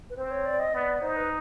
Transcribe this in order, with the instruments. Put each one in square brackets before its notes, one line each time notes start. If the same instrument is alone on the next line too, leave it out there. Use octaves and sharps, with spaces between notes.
[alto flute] B4
[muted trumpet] C4 [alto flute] C5
[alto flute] C#5
D5
D#5
[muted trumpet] B3 [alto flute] D5
[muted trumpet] D#4 [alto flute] C5
[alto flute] B4